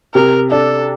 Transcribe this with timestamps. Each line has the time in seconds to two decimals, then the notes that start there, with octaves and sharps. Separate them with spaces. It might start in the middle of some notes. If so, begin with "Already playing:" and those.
0.14 C3 A#4
0.51 D4 A4